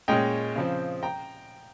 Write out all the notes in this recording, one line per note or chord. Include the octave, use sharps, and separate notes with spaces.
A#2 G#3 C#4 D#5 G5
C#3 F3 C4
G5 A#5